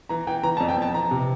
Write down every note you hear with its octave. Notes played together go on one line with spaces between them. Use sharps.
E3 A#5
E3 G5
E3 A#5
A5
F2
G5
F2 A5
E3 A#5
C3